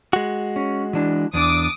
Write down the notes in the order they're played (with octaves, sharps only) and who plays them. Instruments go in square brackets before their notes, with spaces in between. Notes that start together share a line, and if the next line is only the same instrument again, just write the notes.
[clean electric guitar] G#3 F#4
[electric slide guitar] C#4
E3 D4
[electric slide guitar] E2 D4 [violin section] D6 D#6